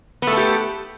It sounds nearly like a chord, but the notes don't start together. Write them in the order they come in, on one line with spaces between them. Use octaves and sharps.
B3 A3 A4 G4